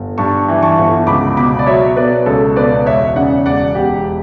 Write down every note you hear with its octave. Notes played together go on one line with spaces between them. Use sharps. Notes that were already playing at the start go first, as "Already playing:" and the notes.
Already playing: G1
G2 A5 C#6
E3
A5 C#6
G1
C#2 B5 D6
B2 B5 D6
D5
F#3 C#5 E5
B2 B4 D5
C#2 A4 C#5
B2 B4 D5
E1 C#5 E5
C#3 D5 F#5
E1 D5 F#5
E1 G4